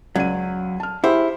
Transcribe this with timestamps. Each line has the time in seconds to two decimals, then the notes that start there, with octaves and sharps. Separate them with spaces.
0.15 C#2 F#3 D5 D#7
0.80 A5 F6
1.04 E4 G4 G#4 C5